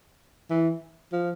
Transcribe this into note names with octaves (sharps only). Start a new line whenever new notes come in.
E3
F3